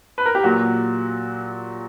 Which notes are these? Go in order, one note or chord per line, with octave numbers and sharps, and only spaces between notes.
B4
A#4
G4
A#2 F#3 F#4